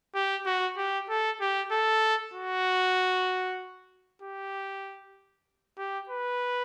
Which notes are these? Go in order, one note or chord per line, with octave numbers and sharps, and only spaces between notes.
G4
F#4
G4
A4
G4
A4
F#4
G4
G4
B4